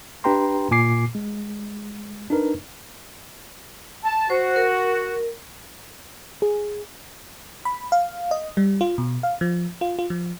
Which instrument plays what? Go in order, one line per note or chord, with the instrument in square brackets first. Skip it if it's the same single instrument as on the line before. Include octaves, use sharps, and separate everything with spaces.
[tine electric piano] D4 G4 B4 G5 A#5 C6
A#2 G#5 D6 C7
G#3
D4 D#4 A#4 B4
[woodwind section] A5
[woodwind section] F#4 [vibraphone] C5
[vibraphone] A#4
[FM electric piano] G#4
B5
F5
D#5
G3
F4
B2
F5
F3
F4
F4
F3